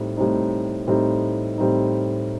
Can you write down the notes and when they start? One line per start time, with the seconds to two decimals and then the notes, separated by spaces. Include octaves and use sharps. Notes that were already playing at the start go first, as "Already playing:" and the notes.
Already playing: A2 G3 C4 D#4
0.17 A2 G3 C4 D#4
0.87 A2 G3 C4 D#4
1.58 A2 G3 C4 D#4